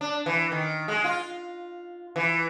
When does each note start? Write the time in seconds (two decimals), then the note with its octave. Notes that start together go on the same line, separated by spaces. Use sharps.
0.01 D4
0.26 E3
0.52 D#3
0.88 G#3
1.04 F4
2.16 E3